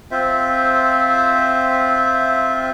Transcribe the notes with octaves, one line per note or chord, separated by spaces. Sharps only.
C4 F4 C5 E5